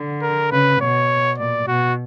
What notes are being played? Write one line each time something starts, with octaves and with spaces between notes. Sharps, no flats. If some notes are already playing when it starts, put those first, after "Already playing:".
Already playing: D3
A#4
C#3 B4
B2 C#5
A#2 D5
B2 F#4